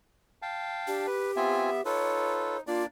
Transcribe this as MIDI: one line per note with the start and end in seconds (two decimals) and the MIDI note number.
0.42 1.06 77
0.42 1.06 79
0.42 1.06 81
0.87 1.06 62
0.87 1.83 67
1.07 1.31 71
1.36 1.81 59
1.36 1.70 60
1.36 1.70 65
1.36 1.81 76
1.36 1.70 80
1.85 2.63 63
1.85 2.57 65
1.85 2.57 69
1.85 2.57 71
1.85 2.61 73
2.67 2.86 58
2.67 2.86 62
2.67 2.83 65
2.67 2.86 74